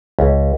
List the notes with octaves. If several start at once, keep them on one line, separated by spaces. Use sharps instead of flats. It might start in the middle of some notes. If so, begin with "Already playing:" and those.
C#2